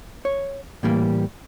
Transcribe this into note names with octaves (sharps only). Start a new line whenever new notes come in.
C#5
A2 E3 G3 A#3